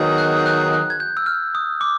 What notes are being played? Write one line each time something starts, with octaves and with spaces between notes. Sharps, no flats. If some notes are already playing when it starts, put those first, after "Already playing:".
Already playing: D#3 F#3 B3 D#4 G#4
F#6
F#6
F#6
G#6
G6
E6
F6
D#6
D6